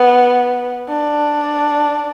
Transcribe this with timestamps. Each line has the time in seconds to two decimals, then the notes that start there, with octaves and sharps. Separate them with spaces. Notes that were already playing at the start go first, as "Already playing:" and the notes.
Already playing: B3
0.89 D4